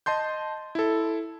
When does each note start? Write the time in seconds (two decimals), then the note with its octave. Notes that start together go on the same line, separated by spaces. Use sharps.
0.06 D#5 A5 C6 G6
0.75 E4 A4